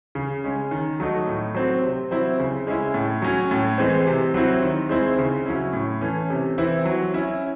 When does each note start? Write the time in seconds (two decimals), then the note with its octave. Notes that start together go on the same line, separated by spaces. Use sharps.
0.15 C#3
0.44 G#3 C#4
0.71 D#3
1.00 F#3 A3 D#4
1.27 A2
1.55 F#3 C4
1.83 C3
2.11 F#3 C4 E4
2.39 C#3
2.67 G#3 C#4 E4
2.94 A2
3.22 F#3 C#4
3.51 A2
3.78 E3 G#3 C4
4.07 C3
4.34 F#3 C4 E4
4.62 D#3
4.89 G#3 C4 E4
5.18 C#3
5.46 F#3 C#4 E4
5.73 A2
6.01 E3 A3 C#4
6.30 C3
6.58 E3 C4 E4
6.85 F#3
7.14 C#4 E4